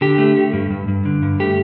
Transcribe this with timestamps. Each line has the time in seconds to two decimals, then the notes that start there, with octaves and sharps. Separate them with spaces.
0.01 D3 G4
0.18 A3
0.36 A3
0.53 G2
0.70 G2
0.88 G2
1.05 D3
1.22 G2
1.40 A3 G4